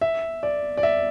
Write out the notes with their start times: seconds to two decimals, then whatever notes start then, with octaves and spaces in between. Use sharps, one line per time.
0.01 E5
0.43 D5
0.77 D5
0.83 E5